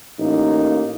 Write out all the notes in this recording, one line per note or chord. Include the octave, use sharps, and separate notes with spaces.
A1 A#3 D#4